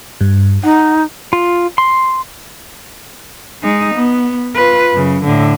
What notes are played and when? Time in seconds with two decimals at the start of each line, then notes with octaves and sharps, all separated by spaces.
0.21 G2
0.64 D#4 F#5
1.33 F4
1.78 C6
3.63 G#3 D#4
3.95 B3
4.54 F4 B4
4.92 F#2 C#3
5.24 A2 D3